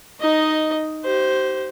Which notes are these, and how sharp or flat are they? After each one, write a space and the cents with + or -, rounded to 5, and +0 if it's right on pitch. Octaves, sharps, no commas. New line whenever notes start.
D#4 +0 D#5 +5
G4 -40 C5 +0